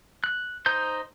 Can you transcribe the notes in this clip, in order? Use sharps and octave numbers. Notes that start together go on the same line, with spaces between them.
F#6
D#4 C5 G6